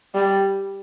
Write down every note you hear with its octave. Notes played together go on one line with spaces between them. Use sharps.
G3